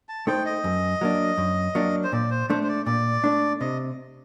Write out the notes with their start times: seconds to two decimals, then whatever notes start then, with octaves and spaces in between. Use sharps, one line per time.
0.09 A5
0.27 A3 D#4 A4 C5 G5
0.46 D#5
0.64 F#2
1.01 F#3 A#3 D4
1.38 F#2
1.75 F#3 A#3 D4
2.04 C5
2.12 A#2 D5
2.30 C5
2.50 A3 D4 C5
2.63 C5
2.69 D5
2.86 A#2 D5
3.24 A3 D4
3.61 C3 D#5